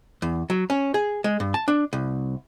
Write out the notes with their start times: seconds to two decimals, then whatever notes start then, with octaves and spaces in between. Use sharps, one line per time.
0.22 E2
0.50 F#3
0.70 C#4
0.94 G#4
1.24 G#3
1.40 G2
1.54 A5
1.68 D4
1.93 C2